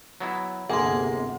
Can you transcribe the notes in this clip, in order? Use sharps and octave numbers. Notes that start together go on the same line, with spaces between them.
F#3 B3 E4
G1 D2 C3 A#3 G#4 F#5 C6